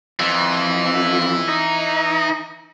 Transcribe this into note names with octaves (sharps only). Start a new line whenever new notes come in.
F2 E3
D#4